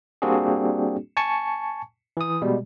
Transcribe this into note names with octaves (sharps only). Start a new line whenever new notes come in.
G3 A#3 C4 D4 F#4 G#4
G#5 A5 C#6 C#7
E3 D#6
B2 G3 G#3